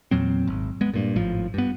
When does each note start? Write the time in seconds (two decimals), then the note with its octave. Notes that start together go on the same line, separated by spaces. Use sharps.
0.11 E2 A#2 F#3 C4
0.47 G#1
0.81 G#3 B3
0.94 G2 A#2
1.16 G#1 A2 F3
1.54 G2 B3